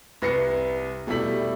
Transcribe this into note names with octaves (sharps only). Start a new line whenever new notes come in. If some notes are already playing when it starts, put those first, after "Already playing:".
C2 B4 A#6 C7 C#7
B2 G3 A3 E4 B6 F#7